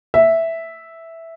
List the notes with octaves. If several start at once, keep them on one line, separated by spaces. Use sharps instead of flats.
E5